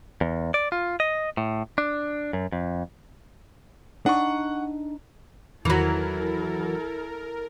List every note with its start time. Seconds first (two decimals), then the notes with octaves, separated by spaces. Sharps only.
0.21 E2
0.54 D5
0.72 F4
1.00 D#5
1.37 A2
1.78 D4
2.33 F#2
2.52 F2
4.06 D4 D#4 F#5 C#6
5.65 E2 D#3 E3 F#3 E4 A4 A#4 A#5